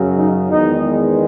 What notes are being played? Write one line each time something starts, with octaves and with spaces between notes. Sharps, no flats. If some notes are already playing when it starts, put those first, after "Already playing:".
Already playing: F#2 C#3 F#3
D#4
E2 D#3 G#3 B3 D#4